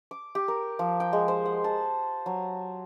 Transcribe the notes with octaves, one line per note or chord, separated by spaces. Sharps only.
D6
G4
A#4
F3
G5
G#3
C5
F#5
A5
F#3